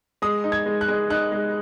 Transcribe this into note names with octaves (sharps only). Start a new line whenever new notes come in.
G#3 D#6
D#4
G#6
G#3
F#6
G#3
D#4 F#6
G#3